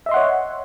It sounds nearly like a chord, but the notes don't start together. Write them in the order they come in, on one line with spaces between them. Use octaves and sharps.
E5 D#5 C6 F#5 C#5